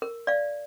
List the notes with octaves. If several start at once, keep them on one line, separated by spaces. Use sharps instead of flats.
A#4
D5 F5